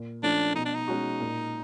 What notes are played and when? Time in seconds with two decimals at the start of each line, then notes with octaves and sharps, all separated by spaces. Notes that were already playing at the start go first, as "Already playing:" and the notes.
Already playing: A#2
0.23 F3 A3 C#4 D4
0.55 B2 D#4
0.65 D4
0.75 D#4
0.88 G#3 C#4 F#4
1.20 A#2